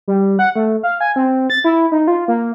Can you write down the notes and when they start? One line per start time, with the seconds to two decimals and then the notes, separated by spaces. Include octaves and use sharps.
0.08 G3
0.39 F#5
0.56 A3
0.83 F5
1.00 G#5
1.16 C4
1.50 A6
1.64 E4
1.92 D#4
2.07 F4
2.28 A#3